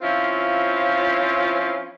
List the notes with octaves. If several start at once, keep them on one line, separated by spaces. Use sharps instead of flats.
F3 C4 C#4 E4 F4